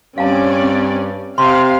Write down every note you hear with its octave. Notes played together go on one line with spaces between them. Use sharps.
G2 C4 C#4 D5 F5 A5
C3 F5 C6